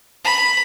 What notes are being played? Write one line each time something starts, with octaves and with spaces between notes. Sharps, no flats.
B5